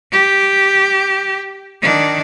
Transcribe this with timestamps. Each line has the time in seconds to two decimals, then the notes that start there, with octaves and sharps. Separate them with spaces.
0.12 G4
1.82 D#3 D4